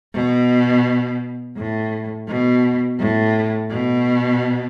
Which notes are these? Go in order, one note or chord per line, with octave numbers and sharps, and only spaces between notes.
B2
A2
B2
A2
B2